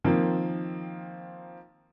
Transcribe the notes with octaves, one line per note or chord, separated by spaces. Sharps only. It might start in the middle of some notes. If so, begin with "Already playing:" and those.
D#3 F3 A#3 C4